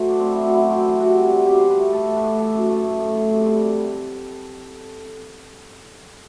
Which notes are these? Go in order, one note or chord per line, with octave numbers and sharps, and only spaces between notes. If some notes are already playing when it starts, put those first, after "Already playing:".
Already playing: F#3 A3 C5
A2 D4
A2 C4
E4
A2 F#4
F#2 E4
F#2 C4
E3
C3 F#4
G3
C3
B2 G4
B2 C5
B4
A3
A2 A4
A3
B4
A2
E3 A4
F#2
A3
A2
A2
A2
C3
G3
C3